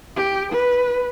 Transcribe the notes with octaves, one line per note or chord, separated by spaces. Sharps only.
G4
B4